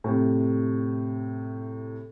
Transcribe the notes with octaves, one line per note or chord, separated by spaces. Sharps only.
A2 C3